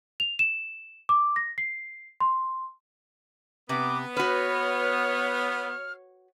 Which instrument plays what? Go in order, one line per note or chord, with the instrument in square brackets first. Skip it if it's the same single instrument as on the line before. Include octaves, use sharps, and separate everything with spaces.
[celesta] F7
E7
D6
A#6
C7
C6
[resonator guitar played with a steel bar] C3 [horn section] B3 [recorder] D6
[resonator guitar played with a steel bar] F#4 B4 [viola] C#5 [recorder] F6